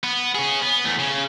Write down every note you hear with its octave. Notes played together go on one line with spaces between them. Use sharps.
B3
C#4 G#4
B3
E2 A3
C#3